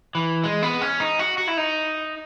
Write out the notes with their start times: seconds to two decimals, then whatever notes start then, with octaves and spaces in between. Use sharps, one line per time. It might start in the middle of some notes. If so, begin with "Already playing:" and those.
0.15 E3
0.44 G#3
0.63 B3
0.81 C#4
1.00 D#4
1.19 F#4
1.38 F#4
1.48 E4
1.57 D#4